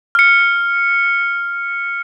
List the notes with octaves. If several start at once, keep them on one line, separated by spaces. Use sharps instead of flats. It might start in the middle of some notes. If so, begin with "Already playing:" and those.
F6 C#7